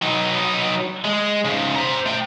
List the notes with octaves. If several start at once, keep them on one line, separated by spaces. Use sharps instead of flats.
F#3 D#4
G#3
G#2 C#3
C5 A#5
A3 G5